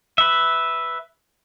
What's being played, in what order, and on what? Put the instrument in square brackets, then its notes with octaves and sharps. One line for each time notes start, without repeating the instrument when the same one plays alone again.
[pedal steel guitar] B4 E5